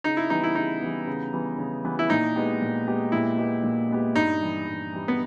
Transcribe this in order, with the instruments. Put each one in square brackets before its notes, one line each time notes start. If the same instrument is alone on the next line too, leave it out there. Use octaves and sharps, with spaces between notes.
[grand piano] C#3 [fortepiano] D#4
[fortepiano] E4
[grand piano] E3 G3 B3 [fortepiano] D#4
[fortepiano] E4
[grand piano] C#3 [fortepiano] D#4
[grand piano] E3 G3 B3
C#3
E3 G3 B3
C#3
E3 G3 B3
[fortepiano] E4
[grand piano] A#2 [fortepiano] D#4
[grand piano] G#3 B3 G4
A#2
G#3 B3 G4
[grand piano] A#2 [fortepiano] E4
[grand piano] G#3 B3 G4
A#2
G#3 B3 G4
[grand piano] G2 [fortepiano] D#4
[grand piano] E3 G3
G2
E3 G3
[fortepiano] B3